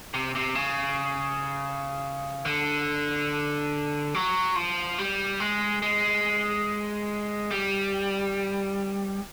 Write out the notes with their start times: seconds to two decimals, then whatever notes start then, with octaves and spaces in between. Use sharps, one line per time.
0.14 C3
0.35 C3
0.55 C#3
2.45 D3
4.15 F#3
4.56 F3
4.98 G3
5.40 G#3
5.82 G#3
7.51 G3